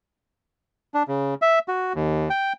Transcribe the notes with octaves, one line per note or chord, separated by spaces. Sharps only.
D4
C#3
E5
F#4
D#2
G5